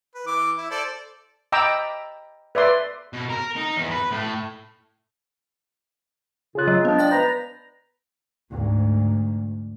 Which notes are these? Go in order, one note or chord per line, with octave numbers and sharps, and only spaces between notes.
B4
E3 D6
E4
A4 C5 D5
D#5 G5 A#5 B5 D6 E6
B4 D5 E5 C6
B2
A#4
D#4
E2
B4
A2
C#3 F4 G#4 F#6
F#3 D#5
F3 G#3 B3 D4
D5 G5 A6
B4 A#5 G6
D2 G#2